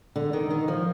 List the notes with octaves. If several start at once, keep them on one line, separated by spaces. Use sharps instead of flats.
D3
D#3
D#3
F3